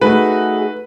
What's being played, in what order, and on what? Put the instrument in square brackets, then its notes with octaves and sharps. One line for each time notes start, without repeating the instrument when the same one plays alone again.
[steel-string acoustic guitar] A3 D#4 F#4 [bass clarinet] G#4 [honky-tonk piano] B4